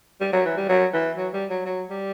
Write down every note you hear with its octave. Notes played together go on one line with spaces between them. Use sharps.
G3
F#3
E3
G3
F#3
E3
F#3
G3
F#3
F#3
G3